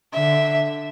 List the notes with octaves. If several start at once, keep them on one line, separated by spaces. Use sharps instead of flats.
D3 E5